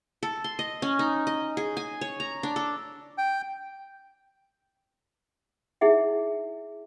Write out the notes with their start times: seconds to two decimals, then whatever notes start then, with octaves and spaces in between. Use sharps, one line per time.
0.23 A4
0.44 C6
0.59 D#5
0.82 C#4
0.99 D#4
1.27 D#5
1.57 G#4
1.77 G#5
2.01 C#5
2.20 A#5
2.43 D4
2.56 A4
3.18 G5
5.81 D#4 E4 G#4 E5 F#5